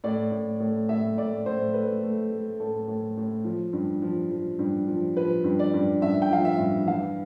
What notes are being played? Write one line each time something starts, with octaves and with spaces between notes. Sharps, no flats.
A2 D5
A2
A2
A2 E5
A2 D5
A2 C5
A3 B4
A3
A3
A2 A4
A2
A2
F3
G2
F3
F3
G2
F3
F3 B4
G2
D5
G2
G2 E5
G5
F3 F5
E5
G2
E3 F5